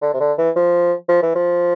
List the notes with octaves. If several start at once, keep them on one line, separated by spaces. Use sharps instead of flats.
D3
C3
D3
E3
F3
F3
E3
F3